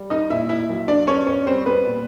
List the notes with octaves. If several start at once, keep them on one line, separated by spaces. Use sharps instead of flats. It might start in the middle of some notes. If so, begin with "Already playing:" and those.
Already playing: G3
D#4 D#5
A#2 E4 E5
E4 E5
B1
D4 D5
B3 C#4 C#5
C#4 C#5
G3 C4 C5
B3 B4
A#2